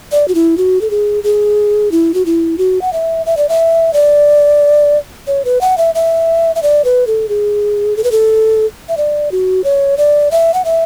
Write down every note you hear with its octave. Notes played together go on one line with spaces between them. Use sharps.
D5
F#4
E4
F#4
A4
G#4
G#4
E4
F#4
E4
F#4
F#5
E5
E5
D5
E5
D5
C#5
B4
F#5
E5
E5
E5
D5
B4
A4
G#4
A4
B4
A4
E5
D5
F#4
C#5
D5
E5
F#5
E5